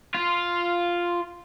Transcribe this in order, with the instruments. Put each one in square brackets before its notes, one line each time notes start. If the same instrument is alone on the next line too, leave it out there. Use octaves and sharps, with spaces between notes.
[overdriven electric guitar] F4